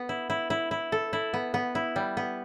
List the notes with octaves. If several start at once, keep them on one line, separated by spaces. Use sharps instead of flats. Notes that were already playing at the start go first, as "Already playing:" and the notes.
Already playing: B3
E4
E4
E4
E4
A4
E4
B3
B3
E4
G3
B3